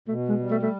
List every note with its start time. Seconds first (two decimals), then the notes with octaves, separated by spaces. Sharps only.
0.08 B2 A3
0.29 G#3
0.39 G3
0.50 A3
0.62 A3